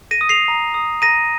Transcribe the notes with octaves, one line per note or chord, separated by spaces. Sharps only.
A#6 D#7
D#6
C7 F7
A#5
D#6
A#5 A#6 D#7